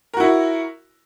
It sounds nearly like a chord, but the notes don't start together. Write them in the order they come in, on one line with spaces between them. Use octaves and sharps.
A#4 F#4 E4